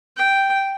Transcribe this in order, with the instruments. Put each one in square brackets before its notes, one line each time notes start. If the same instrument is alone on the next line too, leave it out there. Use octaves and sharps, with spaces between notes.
[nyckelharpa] G5